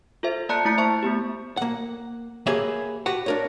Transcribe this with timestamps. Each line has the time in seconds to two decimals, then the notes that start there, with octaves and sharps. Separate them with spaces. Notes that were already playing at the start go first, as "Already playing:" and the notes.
0.23 F4 A4 C5 E5
0.49 A#3 D5 A5 A#5 F#6 C#7
0.65 A3 E4 A#5 G6 C#7
0.78 C5 E5 A5 C#6
1.03 A3 B3 G4
1.57 A#3 F#5
2.47 A#3 G4 G#4 B4 C#5 E5
3.06 F#4 G4 B4 F#5
3.26 D4 A#4 C#5